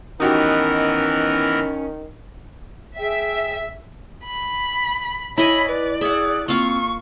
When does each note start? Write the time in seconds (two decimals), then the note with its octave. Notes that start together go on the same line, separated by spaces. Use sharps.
0.20 D#3 E3 B3 C#4 D#4 F#4 G4 A#4
2.97 G#4 E5 G5
4.25 B5
5.38 E4 C#5 D#5 G#5 B5
5.69 B4 D5
6.01 G#4 E5 F#5
6.48 A#3 C4 F4 F5 C#6